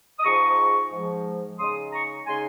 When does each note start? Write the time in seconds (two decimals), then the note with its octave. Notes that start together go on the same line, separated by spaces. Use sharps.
0.19 D#6
0.23 G#2 F3 G#3 A#5 C#6
0.91 G#2 F3 G#3
1.58 C#3 G#3 D#4 C6 D#6
1.92 A#5 C#6
2.26 C#3 G#3 D#4 G#5 C6